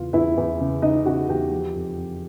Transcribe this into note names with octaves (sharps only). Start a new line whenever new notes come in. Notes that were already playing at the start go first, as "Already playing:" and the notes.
Already playing: E2 C#3 F4 F5
E2 E4 E5
E2
C#3
C#3 D#4 D#5
C#3 F#4 F#5
E2 G4 G5
F3
F2
F2